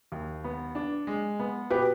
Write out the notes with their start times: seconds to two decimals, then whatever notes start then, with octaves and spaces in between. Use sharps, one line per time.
0.12 D#2
0.44 B3
0.75 D4
1.07 G#3
1.40 B3
1.70 B2 G4 B4